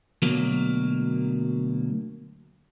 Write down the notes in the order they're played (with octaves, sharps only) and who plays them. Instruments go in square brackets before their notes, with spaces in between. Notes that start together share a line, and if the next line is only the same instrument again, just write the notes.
[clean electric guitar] D2 B2 F#3 A#3